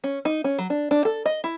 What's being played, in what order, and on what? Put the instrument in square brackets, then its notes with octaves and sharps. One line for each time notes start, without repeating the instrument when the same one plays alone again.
[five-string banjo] C#4
D#4
C#4
F#3
D4
D4
A4
D#5
E4